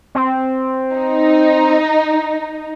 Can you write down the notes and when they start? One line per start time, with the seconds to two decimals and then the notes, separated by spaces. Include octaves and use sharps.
0.15 C4
0.94 D#4